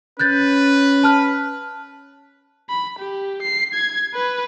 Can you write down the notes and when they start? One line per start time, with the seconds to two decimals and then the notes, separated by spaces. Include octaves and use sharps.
0.19 C#4 B4 F#6 G6 A6
1.04 A5 F6 F#6
2.69 B5
2.99 G4
3.42 C7
3.74 G#6
4.14 B4